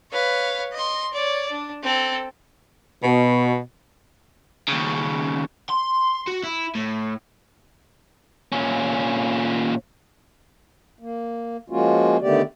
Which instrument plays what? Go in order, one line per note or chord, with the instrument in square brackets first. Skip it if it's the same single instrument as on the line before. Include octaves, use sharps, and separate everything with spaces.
[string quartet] B4 C#5 F5
D#5 C6
C#5 D5
D4
C4 A4
[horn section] B2
[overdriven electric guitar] D#2 C#3
C6
F#4
E4
A2
[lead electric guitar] A#2 C#4
[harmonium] A#3
F3 G#3 A#3 C#4 F4 F#4
D3 D#3 A3 B3 G4 D5